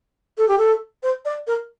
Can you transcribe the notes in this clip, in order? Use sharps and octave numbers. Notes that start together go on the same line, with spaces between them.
A4
G4
A4
C5
D5
A#4